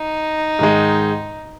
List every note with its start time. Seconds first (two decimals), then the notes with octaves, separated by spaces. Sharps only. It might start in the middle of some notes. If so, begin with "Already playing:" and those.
Already playing: D#4
0.59 G#2 D#3 G#3